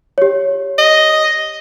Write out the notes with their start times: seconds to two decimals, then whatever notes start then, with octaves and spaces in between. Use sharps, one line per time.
0.18 G4 C#5
0.78 D#5